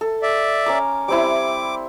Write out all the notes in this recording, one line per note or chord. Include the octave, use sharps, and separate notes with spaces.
A4
D5 E5
C#4 A#4 D6
G3 C4 E4 D6